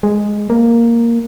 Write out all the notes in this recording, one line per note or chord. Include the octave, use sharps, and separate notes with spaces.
G#3
A#3